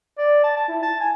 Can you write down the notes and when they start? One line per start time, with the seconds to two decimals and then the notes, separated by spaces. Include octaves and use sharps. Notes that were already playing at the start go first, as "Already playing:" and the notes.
0.18 D5
0.44 A5
0.57 A5
0.68 E4
0.83 A5
1.00 G#5